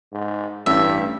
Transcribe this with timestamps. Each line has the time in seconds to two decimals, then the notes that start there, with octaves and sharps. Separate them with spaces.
0.13 G#2
0.66 A1 G2 E5